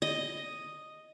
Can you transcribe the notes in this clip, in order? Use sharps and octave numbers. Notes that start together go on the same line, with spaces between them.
D#5